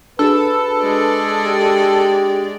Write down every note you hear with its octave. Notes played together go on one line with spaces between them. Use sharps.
D4 F#4 G#4 A4 B4
G#3 D5
G4